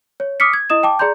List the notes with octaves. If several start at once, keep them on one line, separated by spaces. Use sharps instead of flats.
C#5
D6 D#6 F6 B6 C#7
G#6
E4 D#5 D#6 E7
G5 A5 D6
G#4 D5 A#5 C6 G6